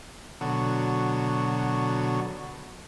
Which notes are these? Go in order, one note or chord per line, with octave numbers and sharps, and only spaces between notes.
B2 D3 F#3